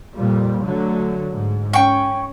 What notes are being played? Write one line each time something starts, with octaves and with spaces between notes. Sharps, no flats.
F2 A#2 G3
D3 F#3 A3
G#2
C#4 G5 C#6